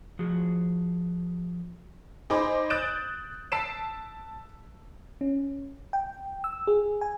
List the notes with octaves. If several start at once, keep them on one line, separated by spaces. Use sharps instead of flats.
F3 F#4 G#4
D#4 G#4 C5 B5 D6
D#6 F#6 G6 A6 D7 E7
A5 E6 B6 C7 D7 E7
C#4
G5
E6
G#4
G#5